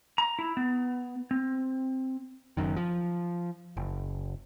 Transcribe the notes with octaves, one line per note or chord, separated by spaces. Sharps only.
A#5
E4
B3
C4
F#1 B1 F#2 D#3
F3
F#1